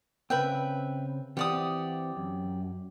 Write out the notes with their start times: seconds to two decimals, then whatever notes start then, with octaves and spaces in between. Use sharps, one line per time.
0.30 C#3 C4 B4 E5 G5
1.37 E3 C4 G4 D5 F#5 D#6
2.16 F#2